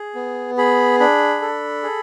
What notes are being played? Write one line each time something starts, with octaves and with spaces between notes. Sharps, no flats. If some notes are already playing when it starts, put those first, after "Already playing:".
Already playing: G#4
B3
G#4 B5
D4 B5
A4
G#4